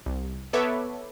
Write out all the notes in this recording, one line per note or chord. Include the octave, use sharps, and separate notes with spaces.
C2
B3 A4 B4 C#5 E5 D6